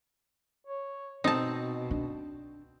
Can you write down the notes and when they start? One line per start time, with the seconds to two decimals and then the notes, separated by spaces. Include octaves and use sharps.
0.67 C#5
1.24 B2 C4 D#4 A5
1.91 D4